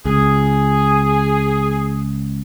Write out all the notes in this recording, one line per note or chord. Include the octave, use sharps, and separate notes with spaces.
C#2 G#4